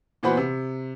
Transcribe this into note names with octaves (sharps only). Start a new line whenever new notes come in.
A#2 E3 B3 F#4 C5 B5
C3